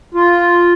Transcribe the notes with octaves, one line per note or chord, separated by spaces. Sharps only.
F4